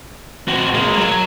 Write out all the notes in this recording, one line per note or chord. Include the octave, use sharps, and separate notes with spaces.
C4 F#4
G#3 A#3
F#3